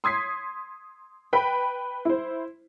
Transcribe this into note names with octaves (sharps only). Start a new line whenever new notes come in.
C6 D#6 G#6 B6 C7
B4 G5 B5 B6
E4 C5